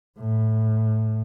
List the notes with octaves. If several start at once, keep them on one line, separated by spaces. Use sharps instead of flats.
A2